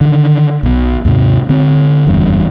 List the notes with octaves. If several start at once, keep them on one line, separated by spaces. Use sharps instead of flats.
D3 D#3
B1 B2
D#2 G#2 C3
D3 C4
F#1 E2 G2